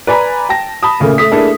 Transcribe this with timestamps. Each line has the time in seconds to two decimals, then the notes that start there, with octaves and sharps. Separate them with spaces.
0.07 B4 D5 G#5 A#5 B5
0.49 G5 A5 A#6
0.83 A5 B5 D#6
1.00 A#2 C#3 A3 A#3
1.18 A3 D#6 B6
1.31 A3 A#3 D4 E4 G#4 A4